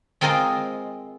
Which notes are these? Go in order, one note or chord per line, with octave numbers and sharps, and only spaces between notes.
G#3 C4 F4 A#4 C5 D#5